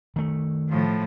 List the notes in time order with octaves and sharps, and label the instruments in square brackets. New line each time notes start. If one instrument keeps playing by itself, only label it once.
[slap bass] D#3 A3
[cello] A2 F3